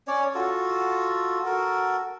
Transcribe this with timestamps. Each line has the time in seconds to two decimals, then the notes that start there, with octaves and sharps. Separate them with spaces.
0.07 C#4 C#5 D5
0.34 F4 F#4 A4
1.45 F#4 A4 A#4